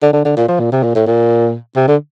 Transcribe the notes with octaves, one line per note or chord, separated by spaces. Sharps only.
D3
D3
D3
A#2
F3
A#2
C3
A#2
A2
A#2
C3
D3